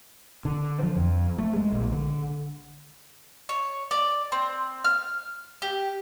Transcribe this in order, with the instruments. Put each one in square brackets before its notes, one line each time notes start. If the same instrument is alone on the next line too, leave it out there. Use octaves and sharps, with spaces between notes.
[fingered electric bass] D3
F3
F2
A3
G#3
A#1
D3
[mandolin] C#5
D5
C4
F6
G4